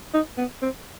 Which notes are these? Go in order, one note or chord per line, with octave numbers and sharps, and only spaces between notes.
D#4
B3
C4